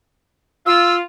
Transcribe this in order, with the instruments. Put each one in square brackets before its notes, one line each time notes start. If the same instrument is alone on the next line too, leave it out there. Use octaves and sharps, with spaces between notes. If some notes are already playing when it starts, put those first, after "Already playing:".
[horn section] F4 [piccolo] E6